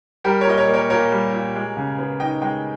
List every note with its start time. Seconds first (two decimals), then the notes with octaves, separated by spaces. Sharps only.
0.24 G3 G4 A#4
0.41 A#4 C#5
0.46 A#2 D#5
0.57 A#4 C#5
0.68 A#3
0.73 A#4 C#5
0.90 A#2 A#4 C#5
1.11 G3
1.33 A#2
1.55 G#3
1.77 C#3
1.98 B3
2.20 D#4 D#5 G5
2.42 G#3 D#5 G5